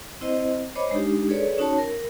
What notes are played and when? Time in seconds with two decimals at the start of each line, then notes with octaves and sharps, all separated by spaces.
0.21 C4 E4 C5 D#5
0.75 C5 C#5 D#5 B5 D6
0.91 G#3 D4 D#4 G4
1.29 G#4 A4 B4 C#5 D5
1.58 C#4 D#4 F#4 C#5 A5
1.78 A#4